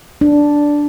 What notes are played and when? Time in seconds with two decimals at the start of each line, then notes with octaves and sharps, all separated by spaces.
0.21 D4